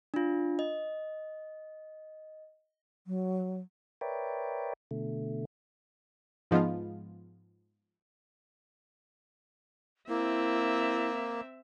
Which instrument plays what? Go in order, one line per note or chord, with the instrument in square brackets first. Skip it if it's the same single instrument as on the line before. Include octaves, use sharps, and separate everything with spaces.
[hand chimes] D4 F4
D#5
[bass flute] F#3
[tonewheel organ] A#4 B4 C#5 D5 E5 G5
B2 D3 A3
[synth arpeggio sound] G#2 F3 G#3 B3 F4
[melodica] A#3 [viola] C4 E5 [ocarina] E4